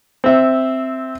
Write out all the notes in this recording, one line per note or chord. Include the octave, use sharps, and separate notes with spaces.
C4 E5